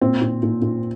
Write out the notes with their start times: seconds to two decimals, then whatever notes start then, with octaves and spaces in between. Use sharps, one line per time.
0.01 A#2 C4
0.22 A#2
0.43 A#2
0.62 A#2